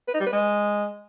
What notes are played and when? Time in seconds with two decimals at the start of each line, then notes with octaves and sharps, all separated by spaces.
0.08 B4
0.14 D#4
0.20 G3
0.26 B4
0.32 G#3